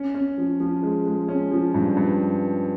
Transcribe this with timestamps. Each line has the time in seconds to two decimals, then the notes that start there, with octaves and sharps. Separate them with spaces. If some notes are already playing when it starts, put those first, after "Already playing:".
Already playing: C#4
0.14 C#4
0.38 F3
0.60 F3
0.83 G#3
1.06 G#3
1.29 C#4
1.51 F3
1.74 G2
1.97 G2